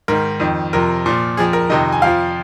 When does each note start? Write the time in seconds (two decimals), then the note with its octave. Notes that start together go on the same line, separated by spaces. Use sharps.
0.08 G#2 D#3 A#4
0.40 F2 D#3
0.73 F2 C3 F3 A#4
1.06 A#2 F3
1.37 F2 F3 G#4
1.53 A#4
1.70 F2 C3 D#3 D#5
1.92 G#5
2.02 F2 F3 F5